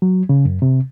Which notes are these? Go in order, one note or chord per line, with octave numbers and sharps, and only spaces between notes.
F#3
C#3
F#2
C3